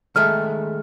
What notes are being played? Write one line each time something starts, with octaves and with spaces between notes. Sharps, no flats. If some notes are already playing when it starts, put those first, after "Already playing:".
D#3 G#3 A3 F6